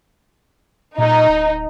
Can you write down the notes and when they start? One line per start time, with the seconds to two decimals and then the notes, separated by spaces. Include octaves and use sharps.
0.98 A#2 D#4
1.28 D1